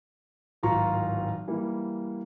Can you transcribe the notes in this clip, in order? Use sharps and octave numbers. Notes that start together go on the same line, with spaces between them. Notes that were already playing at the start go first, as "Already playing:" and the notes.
D1 G#1 F4 A#5 C#6
E3 G3 A#3